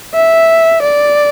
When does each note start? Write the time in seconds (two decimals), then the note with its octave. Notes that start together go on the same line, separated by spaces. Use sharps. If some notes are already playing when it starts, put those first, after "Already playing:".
0.14 E5
0.82 D5